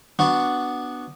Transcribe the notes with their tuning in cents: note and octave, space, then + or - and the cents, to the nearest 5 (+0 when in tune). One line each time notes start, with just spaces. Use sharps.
B3 +0 D4 +0 F#4 +0